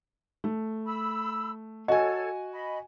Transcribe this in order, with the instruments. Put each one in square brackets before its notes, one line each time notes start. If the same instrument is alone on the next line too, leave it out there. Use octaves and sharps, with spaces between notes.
[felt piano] A3
[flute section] B5 E6
[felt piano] F#4 G#5 [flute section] A4 C#5 [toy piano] D#5
[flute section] D#5 B5